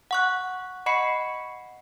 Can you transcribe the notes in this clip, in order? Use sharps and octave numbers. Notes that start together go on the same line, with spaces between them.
F#5 C#6 F#6
D#5 F#5 B5 C#6 C7 C#7